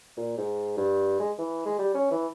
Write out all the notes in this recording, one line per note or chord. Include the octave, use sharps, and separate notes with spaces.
A#2
G#2
G2
G#3
E3
G#3
G3
C#4
E3